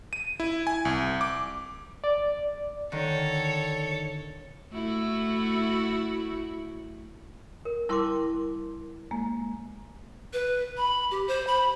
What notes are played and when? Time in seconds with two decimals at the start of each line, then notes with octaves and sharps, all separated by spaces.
0.13 D#7
0.40 E4
0.67 G#5
0.85 C2
1.21 D6
2.04 D5
2.92 D3 D#3 A4 C#5
4.73 A3 E4 F#4
7.65 A#4
7.89 G3 E4 A#4 A5 C6 D6
9.11 G#3 A#3
10.33 B4
10.77 B5
11.11 G4
11.28 C5
11.47 B5